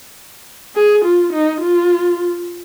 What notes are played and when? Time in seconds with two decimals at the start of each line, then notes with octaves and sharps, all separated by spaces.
0.75 G#4
1.05 F4
1.33 D#4
1.61 F4